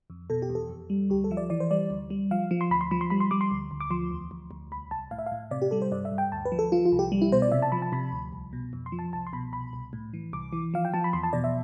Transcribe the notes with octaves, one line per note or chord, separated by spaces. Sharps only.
F2
B2 A4
G4
E2
A4
F2
G3
D2 G4
A4
F3 E5
D5
E3 D5
C5
G3 D5
D2
G3
F3 F5
F3
C6
D2 B5
C6
F3 B5
C6
G3 B5
C6
G3 D6
C6
D2
D2
D6
F3 C6
E2
D2
D2
C2 B5
C2 A5
A2 F5
E5
F5
A2
C3 D5
G4
G3 A4
C5
G2 D5
E5
G2
G5
D2 A5
B4
F3
A4
F3 F4
F4
C2
G4
G3
E4
B2 C5
D5
C3 E5
A5
F3 B5
A5
C3 B5
D2
C2
B2
F2
C6
F3
A5
C2 A5
C6
B2 B5
C2 B5
C2
A2
E3
C2 D6
E3
F3 F5
G5
F3 A5
B5
E2 C6
A5
B2 D5
E5